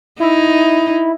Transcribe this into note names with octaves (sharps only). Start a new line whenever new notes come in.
D#4 E4